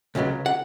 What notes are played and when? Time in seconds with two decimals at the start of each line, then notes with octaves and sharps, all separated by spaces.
0.15 C#2 C#3 F#3 B3
0.46 F#5